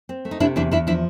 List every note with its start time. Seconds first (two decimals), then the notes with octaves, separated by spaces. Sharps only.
0.09 C4
0.25 A3
0.31 D#4
0.40 C3 D4 E4
0.56 E2 D4 E4
0.71 E2 D4 E4
0.87 F3 D4 E4